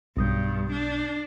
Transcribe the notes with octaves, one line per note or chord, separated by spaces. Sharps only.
B1 G2 D#6 G6
D4